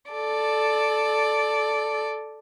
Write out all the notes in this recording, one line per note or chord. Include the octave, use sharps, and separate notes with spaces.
A4 D5